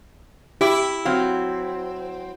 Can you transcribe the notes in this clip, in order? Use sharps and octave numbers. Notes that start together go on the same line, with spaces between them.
E4 G4 D6
F#3 C4 F5